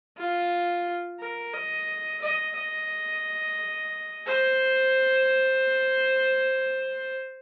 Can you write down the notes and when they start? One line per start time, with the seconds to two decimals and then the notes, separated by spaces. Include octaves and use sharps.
0.17 F4
1.20 A#4
1.54 D#5
2.22 D#5
2.56 D#5
4.26 C5